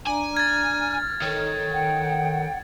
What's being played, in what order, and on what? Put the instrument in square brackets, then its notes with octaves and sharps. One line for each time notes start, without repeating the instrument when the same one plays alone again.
[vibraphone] D4 D5 A#5 [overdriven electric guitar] G#5
[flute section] F6 [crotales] G#6 A6
[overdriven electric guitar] D#3 [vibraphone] A4 C#5
[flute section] F#5 G5